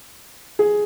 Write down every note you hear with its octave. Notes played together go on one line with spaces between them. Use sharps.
G#4